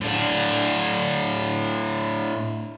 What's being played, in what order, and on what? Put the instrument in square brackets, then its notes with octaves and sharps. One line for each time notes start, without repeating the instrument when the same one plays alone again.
[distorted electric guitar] A2 D4